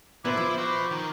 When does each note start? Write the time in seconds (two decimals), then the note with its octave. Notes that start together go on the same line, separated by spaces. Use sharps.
0.25 D2 A#2 B3 E4 C5 D6
0.37 F3
0.58 F#4 B4
0.91 D#3